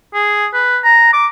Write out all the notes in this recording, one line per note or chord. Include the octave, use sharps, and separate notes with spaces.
G#4
B4
A#5
D6